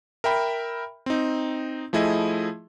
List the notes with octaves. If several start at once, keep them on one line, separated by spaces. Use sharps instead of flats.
A#4 E5 G5 B5
C4 D#4
F3 A3 E4 G#4 D#5